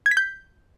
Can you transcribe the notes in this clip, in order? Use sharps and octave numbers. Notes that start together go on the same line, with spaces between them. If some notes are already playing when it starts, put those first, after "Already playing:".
G#6
B6
G6